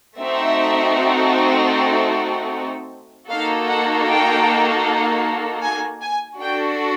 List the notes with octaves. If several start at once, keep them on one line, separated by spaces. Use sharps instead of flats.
A3 C4 D#4 F#4 A4 E5
A#3 D#4 F#4 A4 F5
F#5
G5
G#5
G#5
D4 F#4 A4 G5